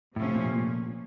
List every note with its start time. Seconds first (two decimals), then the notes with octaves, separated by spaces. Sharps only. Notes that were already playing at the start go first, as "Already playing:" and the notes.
0.16 A2 C3 F3 A3 C#4
0.35 A#2